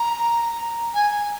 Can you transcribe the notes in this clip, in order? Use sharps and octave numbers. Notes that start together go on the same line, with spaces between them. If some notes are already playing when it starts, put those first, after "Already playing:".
Already playing: A#5
G#5